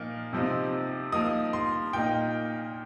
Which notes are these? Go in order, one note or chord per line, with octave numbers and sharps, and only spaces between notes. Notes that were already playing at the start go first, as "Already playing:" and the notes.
Already playing: A#2 F3 A#3 D#4
C3 F3 C4 D#4
F3 A#3 D#4 D#6
C6
A#2 A#3 D#4 G5